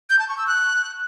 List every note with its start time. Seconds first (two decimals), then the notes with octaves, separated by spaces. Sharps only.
0.10 G6
0.19 A5
0.28 C#6
0.38 E6
0.47 F#6